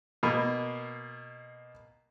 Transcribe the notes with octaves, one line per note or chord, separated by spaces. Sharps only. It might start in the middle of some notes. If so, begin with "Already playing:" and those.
B2 A#3